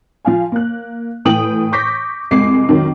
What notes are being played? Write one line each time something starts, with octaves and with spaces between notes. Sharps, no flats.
F3 F5 G#5
A#3 F#6
A2 E3 G5 D#6 F#7
C#6 D6 G6 A#6 B6
C2 F2 G#3 D6 C7
F2 D#3 F#3